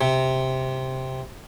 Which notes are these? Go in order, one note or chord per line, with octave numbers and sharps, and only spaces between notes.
C3